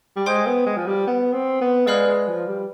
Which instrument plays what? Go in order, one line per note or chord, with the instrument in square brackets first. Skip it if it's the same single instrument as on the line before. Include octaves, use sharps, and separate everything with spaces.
[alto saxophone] G3
[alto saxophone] G#3 [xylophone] C5 G5 C6 D#6 G6
[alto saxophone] B3
G#3
F3
G3
B3
C4
B3
[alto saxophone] G#3 [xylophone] B4 D5 F5 B5 F6
[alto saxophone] G#3
F3
G3